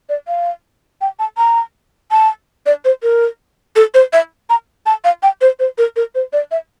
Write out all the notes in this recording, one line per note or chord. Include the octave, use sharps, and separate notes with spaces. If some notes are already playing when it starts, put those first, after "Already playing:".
D5
F5
G5
A5
A#5
A5
D5
C5
A#4
A4
C5
E5
A#5
A5
F5
G5
C5
C5
A#4
A#4
C5
D5
E5